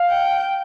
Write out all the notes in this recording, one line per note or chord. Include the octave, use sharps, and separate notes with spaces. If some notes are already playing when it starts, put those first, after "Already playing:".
Already playing: F5
G5